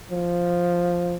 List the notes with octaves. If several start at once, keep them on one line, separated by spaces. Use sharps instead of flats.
F3